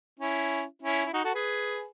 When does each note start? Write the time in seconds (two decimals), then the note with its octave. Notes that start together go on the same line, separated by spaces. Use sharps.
0.19 C#4 E4
0.82 C#4 E4
1.06 E4
1.13 D#4 F#4
1.24 F#4 A4
1.34 G#4 B4